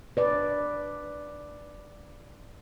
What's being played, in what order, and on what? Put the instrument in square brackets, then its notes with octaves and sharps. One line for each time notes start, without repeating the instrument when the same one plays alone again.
[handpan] B4 D5